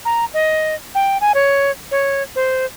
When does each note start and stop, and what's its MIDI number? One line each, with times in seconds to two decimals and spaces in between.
0.05 0.25 82
0.34 0.75 75
0.95 1.18 79
1.21 1.32 80
1.34 1.71 73
1.91 2.23 73
2.36 2.66 72